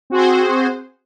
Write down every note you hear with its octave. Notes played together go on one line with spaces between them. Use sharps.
C4 F#4 G#4 C5